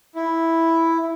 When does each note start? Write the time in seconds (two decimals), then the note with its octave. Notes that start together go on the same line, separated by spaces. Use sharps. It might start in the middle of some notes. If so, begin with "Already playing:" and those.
0.15 E4